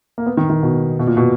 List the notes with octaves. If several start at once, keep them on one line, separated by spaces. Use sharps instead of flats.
A#3
B3
D#3
D#3
B2
B2
A#2
B2